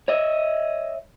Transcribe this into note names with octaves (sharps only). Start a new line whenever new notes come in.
C#5 D#5 E5